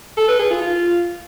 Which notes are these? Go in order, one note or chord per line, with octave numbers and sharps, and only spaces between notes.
A4
B4
G#4
F4
F4